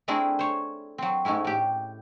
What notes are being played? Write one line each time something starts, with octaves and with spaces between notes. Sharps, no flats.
A3 C4 D4 E4 G#4 A#4
C5 C#5
F#3 C4
G#2 A3 C#4 E4
A2 G4